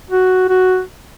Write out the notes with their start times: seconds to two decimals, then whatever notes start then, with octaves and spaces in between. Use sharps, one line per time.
0.10 F#4
0.49 F#4